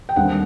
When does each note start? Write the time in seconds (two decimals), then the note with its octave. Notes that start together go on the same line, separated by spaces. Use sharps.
0.09 G5
0.16 D#2 D3 G3 C4 F#5